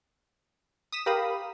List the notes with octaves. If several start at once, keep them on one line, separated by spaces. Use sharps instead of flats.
D#6 B6 E7
G4 A#4 F5 B5 D#6